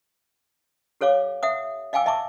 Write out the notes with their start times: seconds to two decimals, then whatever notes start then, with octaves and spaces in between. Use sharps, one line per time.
1.01 G4 A4 C#5 F5 D6
1.43 E5 F#5 D#6
1.93 D#5 F5 G5 G#5 D6 E6
2.06 D#5 E5 A5 C#6 D6